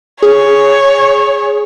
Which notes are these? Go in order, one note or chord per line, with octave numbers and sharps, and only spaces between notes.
G#4 C#5